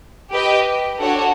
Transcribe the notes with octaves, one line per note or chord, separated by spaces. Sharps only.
G4 B4 D#5 G5
D4 F#4 A4 C#5 F#5